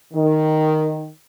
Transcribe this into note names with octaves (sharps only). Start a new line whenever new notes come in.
D#3